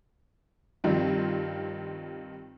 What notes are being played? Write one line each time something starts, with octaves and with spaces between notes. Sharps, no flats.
G2 D#3 F3 C4